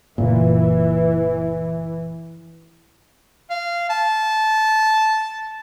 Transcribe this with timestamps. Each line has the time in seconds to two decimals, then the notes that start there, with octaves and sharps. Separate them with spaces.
0.18 F#1 A#2 E3
3.50 F5
3.90 A5